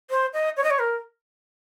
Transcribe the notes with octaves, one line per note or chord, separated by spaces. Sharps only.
C5
D#5
C#5
D#5
C#5
A#4